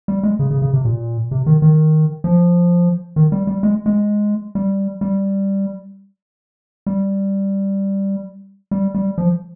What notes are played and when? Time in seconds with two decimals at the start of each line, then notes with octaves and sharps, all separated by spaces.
0.08 G3
0.23 G#3
0.39 C#3
0.51 C#3
0.62 C#3
0.74 C3
0.85 A#2
1.31 C3
1.47 D#3
1.62 D#3
2.24 F3
3.16 D#3
3.32 G3
3.47 G3
3.63 G#3
3.86 G#3
4.55 G3
5.01 G3
6.87 G3
8.71 G3
8.95 G3
9.18 F3